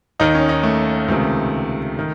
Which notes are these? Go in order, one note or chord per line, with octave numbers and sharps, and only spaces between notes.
D#2 D#3 D#4
C#4
D#4
A3
C#2 C3 D#3
D#3